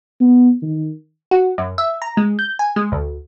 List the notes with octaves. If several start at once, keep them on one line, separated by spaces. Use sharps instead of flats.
B3
D#3
F#4
F#2
E5
A#5
G#3
G6
G#5
G#3
D2